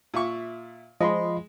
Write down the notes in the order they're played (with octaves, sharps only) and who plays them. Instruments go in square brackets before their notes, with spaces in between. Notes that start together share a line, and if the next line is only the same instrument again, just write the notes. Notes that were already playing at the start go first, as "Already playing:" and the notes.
[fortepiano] A#2 E5 C#6
[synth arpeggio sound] F3 [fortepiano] G#3 [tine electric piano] D#5 B5 C6